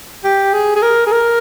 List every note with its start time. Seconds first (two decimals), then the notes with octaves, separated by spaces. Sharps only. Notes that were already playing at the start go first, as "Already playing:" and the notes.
0.24 G4
0.53 G#4
0.76 G#4
0.82 A#4
1.06 G#4
1.12 A#4